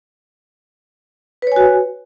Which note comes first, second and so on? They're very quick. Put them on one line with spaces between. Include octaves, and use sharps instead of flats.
B4 C#5 G#5 F#4